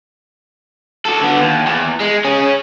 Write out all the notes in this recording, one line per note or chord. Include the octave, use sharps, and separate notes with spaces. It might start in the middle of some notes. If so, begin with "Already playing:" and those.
F#4 A4
D3 B3
D#2
E2
G#3
C#4 G#4